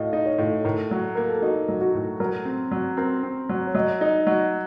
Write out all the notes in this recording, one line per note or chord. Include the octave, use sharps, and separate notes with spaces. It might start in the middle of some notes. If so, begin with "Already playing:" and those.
Already playing: A2 F#4 D#5 F5
D#4
C#5
A2
A2 A#4
F#3
A#3 A#4
A4
D#4 F#4
F#3
F#4
A2
F#3 A#4
C4
F#3
C4 A#4
C4
F#3
C#5
F#3 D#5
D#4
F#3